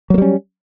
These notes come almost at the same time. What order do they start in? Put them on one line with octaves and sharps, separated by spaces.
F#3 A#3 G3 C#4